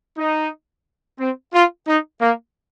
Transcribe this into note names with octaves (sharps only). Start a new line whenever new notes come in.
D#4
C4
F4
D#4
A#3